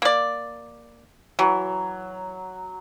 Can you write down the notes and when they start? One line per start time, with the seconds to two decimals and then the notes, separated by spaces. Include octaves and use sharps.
0.02 A#3 D5
1.39 E3 F#3